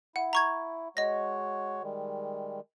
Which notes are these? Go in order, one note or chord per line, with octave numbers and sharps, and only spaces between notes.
E4 F#5
A#5 C#6 G#6
G#3 F#4 C#5 D#5 A#6
D#3 G3 G#3